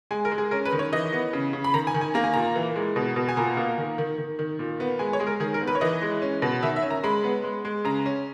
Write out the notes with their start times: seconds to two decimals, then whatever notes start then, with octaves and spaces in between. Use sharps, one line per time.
0.11 G#3 G#5
0.25 A#4
0.32 G#3
0.38 G#4
0.51 C#4 A#4
0.65 B4
0.72 D#3
0.79 C#5
0.93 E3 D#5
1.13 B3
1.33 C#3
1.53 C#3
1.64 B5
1.74 D#3 A#5
1.87 G#5
1.94 D#3
2.01 G#5
2.14 A#3 A#5
2.24 G#5
2.34 A#2 A#5
2.56 E3
2.76 G#3
2.96 B2
3.16 B2
3.28 G#5
3.37 A#2 A#5
3.57 A#3
3.78 D#3
3.98 D#3
4.18 D#3
4.39 D#3
4.59 A#2
4.80 B3
4.99 G#3 G#5
5.13 C#5
5.20 G#3 G#4
5.27 A#4
5.40 D#3 G#4
5.54 A#4
5.61 B3
5.67 B4
5.75 C#5
5.81 E3 D#5
6.02 G#3
6.22 C#4
6.42 B2
6.63 D#3 E5
6.76 E5
6.82 C#4
6.90 A#5
7.03 G#3 B5
7.24 B3
7.44 G#3
7.65 G#3
7.85 C#3 A#5
8.06 C#4